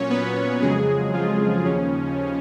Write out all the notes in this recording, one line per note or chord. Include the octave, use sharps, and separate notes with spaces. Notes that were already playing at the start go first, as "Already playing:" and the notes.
Already playing: A#2 F#3 C#4 C#5
B3 B4
F2 C#3 F#3 G#3 G#4
F3 F4
D#2 C#3 F3 C#4